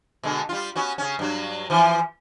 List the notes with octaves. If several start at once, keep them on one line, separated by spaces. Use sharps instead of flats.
B2 D3 G#3
G3 F4
B3 C#4 F#4
C#3 C#4
G2 F#3
E3 F3